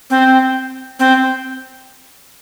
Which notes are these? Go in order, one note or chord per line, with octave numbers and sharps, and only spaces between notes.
C4
C4